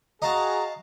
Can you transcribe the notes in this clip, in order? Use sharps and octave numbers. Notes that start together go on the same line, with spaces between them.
F#4 G#4 D#5 F5 A5 A#5